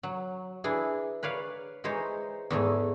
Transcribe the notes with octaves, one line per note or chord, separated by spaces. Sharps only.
F#3
E3 D4 E4 G#4
B4 C#5 D5 F5
E3 G#3 D#4 C5 C#5
E2 G#2 A3 G#5